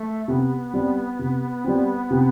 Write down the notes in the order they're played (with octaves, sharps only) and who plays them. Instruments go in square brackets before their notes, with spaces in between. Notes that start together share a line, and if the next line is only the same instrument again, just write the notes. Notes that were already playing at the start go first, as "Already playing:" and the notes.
Already playing: [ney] A3
[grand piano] C3 [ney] B3
[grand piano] G3 C4
C3
G3 C4
C3